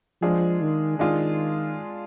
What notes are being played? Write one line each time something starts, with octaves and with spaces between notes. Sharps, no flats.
F3 G#3 D4 F4 G#4
D#3
D#3 G#3 D4 F4 G#4